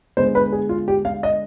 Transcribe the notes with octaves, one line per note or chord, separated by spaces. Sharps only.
D3 G#3 B3 C5
B4
G#4
F4
G4
F5
D#5